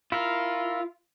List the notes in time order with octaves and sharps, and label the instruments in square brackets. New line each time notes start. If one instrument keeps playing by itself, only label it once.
[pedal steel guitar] E4 A#4 [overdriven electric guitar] F4